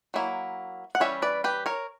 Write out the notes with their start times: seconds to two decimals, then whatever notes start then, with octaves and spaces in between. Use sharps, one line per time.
0.14 F#3 A#3 E4
0.95 F#5
1.00 E3 G3 C#4 C#5 E5
1.22 B4 D5
1.44 G4 B4
1.66 A#4 C#5